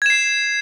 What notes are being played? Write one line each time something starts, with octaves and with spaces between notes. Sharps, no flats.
G#6 C7 E7